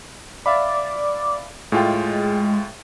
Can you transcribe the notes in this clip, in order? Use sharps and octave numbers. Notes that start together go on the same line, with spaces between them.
D5 E5 F5 B5
A2 G#3 F4 G5